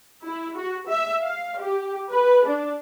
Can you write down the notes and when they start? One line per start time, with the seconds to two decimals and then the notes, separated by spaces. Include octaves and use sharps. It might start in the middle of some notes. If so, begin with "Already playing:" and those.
0.24 E4
0.57 F#4
0.88 E5
1.23 F5
1.59 G4
2.11 B4
2.46 D4